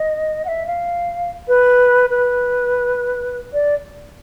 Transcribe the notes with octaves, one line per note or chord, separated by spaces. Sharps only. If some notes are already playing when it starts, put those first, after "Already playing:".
Already playing: D#5
F#5
E5
F5
B4
B4
D5